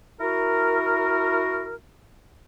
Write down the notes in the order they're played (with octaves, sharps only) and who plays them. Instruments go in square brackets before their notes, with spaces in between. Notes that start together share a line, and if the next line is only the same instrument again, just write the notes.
[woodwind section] E4 F#4 A#4